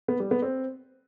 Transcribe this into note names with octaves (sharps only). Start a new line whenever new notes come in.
B3
G3
B3
C4